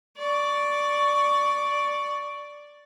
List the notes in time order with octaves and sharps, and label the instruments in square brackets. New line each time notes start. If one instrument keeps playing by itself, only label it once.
[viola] D5 C#6